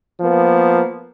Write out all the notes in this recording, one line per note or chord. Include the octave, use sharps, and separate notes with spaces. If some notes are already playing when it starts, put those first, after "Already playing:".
F3 A#3 B3